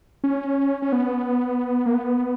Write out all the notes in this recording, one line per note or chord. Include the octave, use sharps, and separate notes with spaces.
C#4
C#4
B3
A#3
B3